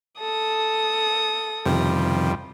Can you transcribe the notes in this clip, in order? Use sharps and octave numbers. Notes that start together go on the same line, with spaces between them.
A4 D#6
F2 C3 D#3 G3